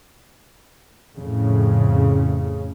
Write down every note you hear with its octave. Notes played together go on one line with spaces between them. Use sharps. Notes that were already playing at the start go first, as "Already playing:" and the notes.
F2 A2 C#3